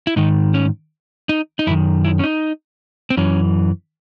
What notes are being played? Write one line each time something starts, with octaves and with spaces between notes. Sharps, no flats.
E4
G#2 D#3 D#4
C#4
D#4
D#4
F#2 D#3 E4
E4
C#4
D#4
C4
F#2 E3 C#4